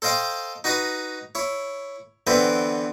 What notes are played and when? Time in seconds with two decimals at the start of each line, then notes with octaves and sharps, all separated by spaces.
0.02 A4 C5 D#5 F5 G5
0.64 D#4 F#4 B4 A#5 B5
1.35 E4 C#5
2.27 D3 E3 B3 C4 E4 C5